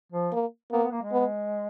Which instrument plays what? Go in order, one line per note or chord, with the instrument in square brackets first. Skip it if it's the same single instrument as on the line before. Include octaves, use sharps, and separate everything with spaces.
[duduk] F3
[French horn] A#3
[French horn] A#3 [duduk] B3
[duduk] B3
A#3
G#3
[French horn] B3